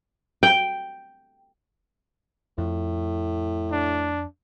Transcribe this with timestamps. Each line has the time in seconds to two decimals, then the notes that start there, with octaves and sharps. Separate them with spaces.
0.43 G5
2.58 F2 A2
3.71 D4